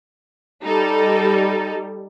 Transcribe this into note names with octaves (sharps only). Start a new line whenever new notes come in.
G3 D#4 A4